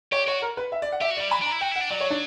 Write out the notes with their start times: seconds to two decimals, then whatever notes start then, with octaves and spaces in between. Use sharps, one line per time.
0.12 G4 C#5
0.28 F#4 C#5
0.42 A#4
0.57 B4
0.72 E5
0.82 D5
0.92 F#5
1.01 G4 E5
1.11 F#4
1.17 D5
1.21 G3
1.31 F#3 B5
1.42 D4 A#5
1.51 E4
1.61 F#4 G5
1.71 E4 F#5
1.81 D4
1.90 F#3 D5
2.01 C#5
2.10 D4